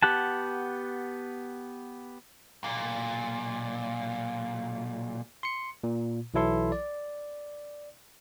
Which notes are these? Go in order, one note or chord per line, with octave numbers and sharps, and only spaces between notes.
B3 G4 F#5 A5
B1 A#2
C6 C#7
A#2
B1 E3 F#3 E4 A4 C6
D5